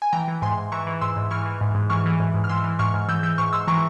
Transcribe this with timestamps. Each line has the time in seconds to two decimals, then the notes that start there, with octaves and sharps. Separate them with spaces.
0.02 G#5
0.13 E3 G5 A#5
0.28 E3
0.42 G#2 G#5 C6
0.57 G#2
0.72 E3 A#5 C#6
0.87 E3
1.01 G#2 C6 E6
1.16 G#2
1.31 E3 C#6 F6
1.46 E3
1.61 G#2
1.75 G#2
1.90 E3 C#6 F6
2.06 E3
2.20 G#2
2.34 G#2
2.44 F6
2.49 E3 C6 E6
2.64 E3
2.79 G#2 C#6 F6
2.94 G#2
3.08 E3 E6 G6
3.23 E3 E6 G6
3.38 G#2 C#6 F6
3.53 G#2 C6 E6
3.68 E3 A#5 C#6